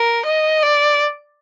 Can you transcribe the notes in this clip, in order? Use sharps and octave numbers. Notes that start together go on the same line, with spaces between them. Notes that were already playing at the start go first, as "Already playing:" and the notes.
Already playing: A#4
D#5
D5